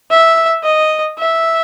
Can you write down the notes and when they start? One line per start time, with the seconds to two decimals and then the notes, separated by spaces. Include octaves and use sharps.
0.11 E5
0.64 D#5
1.18 E5